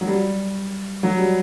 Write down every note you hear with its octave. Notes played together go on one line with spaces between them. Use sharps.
F#3
G3
F#3
G3